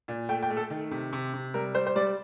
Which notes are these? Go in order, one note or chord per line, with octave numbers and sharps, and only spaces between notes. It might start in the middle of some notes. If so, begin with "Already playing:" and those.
A#2
A3 G5
G5
A3
A4
D#3
C3
C3
C3
G3 A#4
G3 C5
C5
G3 D5